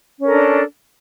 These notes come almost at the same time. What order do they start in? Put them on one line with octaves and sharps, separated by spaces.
C#4 A#4 A4 D4